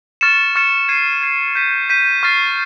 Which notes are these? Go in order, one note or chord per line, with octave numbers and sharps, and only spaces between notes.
C#6 F6 A6 C#7 E7
C#6 F6 A6 C#7 E7
G#6 C7 D#7
G#6 C7 D#7
G6 B6 D#7
G6 B6 D#7
C#6 F6 A6 C7